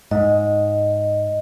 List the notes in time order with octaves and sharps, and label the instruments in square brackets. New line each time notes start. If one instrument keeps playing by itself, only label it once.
[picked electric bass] G#2 [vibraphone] D#5